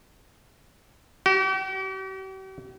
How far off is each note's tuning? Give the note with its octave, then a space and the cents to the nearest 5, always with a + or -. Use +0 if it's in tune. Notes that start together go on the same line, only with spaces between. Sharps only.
G4 -45